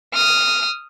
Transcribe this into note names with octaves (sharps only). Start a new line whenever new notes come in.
D#6 F6